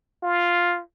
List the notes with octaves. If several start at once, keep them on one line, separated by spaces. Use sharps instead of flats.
F4